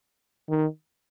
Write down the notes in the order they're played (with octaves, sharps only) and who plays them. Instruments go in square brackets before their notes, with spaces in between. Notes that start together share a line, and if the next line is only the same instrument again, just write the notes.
[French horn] D#3